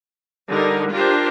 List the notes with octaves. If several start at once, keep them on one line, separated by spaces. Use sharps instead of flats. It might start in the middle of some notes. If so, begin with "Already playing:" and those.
D3 G3 D#4 A#4
D4 F4 G4 A#4 C5